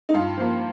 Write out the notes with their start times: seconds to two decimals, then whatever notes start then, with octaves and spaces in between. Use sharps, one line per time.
0.09 D#4
0.14 G2 F4
0.37 F3 A#3